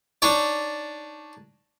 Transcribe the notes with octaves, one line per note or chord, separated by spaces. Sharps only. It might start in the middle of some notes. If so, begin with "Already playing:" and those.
D4 D#4 C#5 D5